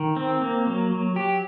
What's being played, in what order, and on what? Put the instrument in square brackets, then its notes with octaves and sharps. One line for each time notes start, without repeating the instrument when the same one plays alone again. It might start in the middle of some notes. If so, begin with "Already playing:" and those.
Already playing: [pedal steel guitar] D#3
C4
A#3
F#3
F#3
F#3 G4